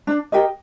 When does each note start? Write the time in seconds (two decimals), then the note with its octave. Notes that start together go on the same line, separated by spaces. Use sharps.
0.07 D4
0.32 G4 A#4 D#5